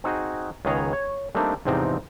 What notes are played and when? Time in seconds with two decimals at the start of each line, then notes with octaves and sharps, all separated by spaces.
0.04 C4 D#4 F#4 G#4
0.65 C#2 D#3 B3 G#4 C#5 A#5
0.93 C#5
1.35 G3 A3 A#3 C4 D4 D#4
1.65 E2 G#2 C3 F3 C4 D#4